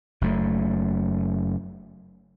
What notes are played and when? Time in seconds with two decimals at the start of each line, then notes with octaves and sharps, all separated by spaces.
0.21 F#1 F#2 A3